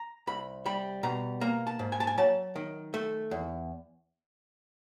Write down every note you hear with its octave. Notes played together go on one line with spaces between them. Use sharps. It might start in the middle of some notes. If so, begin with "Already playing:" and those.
Already playing: A#5
C2 B5
G3 B5
B2 A#5
A#3 A#5
A5
G#2
G#5
A5
G#5
F#3 A5
D#3
A3
E2